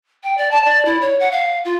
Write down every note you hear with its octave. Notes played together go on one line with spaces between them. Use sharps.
G5
D5
A5
D5
E4
C#5
F#5
F5
F4